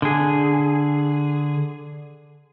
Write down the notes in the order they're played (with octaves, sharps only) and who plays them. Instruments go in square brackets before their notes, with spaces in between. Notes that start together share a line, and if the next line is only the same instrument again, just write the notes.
[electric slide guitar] D3 G#4